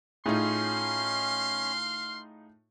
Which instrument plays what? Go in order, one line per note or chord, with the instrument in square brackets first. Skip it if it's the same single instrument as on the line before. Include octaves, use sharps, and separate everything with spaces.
[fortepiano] A2 [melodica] C#4 [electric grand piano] D#4 F4 G#4 [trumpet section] F5 C6